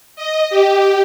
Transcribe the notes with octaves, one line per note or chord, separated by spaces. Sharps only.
D#5
G4